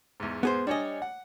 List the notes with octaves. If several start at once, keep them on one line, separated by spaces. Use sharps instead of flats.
E2 G#2
B3 G#4 C5
G3 D4 C#5 D#5 G#5
F#5